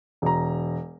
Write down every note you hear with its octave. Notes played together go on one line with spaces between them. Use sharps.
E1 A#5